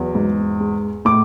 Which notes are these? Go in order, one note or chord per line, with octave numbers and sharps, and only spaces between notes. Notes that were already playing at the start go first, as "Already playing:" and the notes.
Already playing: E2 F#3
G#2
G#3
A2 D6